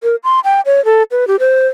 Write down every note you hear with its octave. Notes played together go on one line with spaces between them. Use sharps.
A#4
C6
G5
C#5
A4
B4
G4
C5